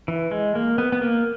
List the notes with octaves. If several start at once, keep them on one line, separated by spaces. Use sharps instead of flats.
E3
G#3
A#3
B3
B3
A#3